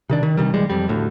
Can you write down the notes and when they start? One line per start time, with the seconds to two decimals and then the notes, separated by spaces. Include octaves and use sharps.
0.09 C3 D#3 D4
0.23 D#3
0.37 G2 C3 D#3 G3
0.54 B1 E3 G3 G#3
0.70 F2 G3
0.89 D2 A2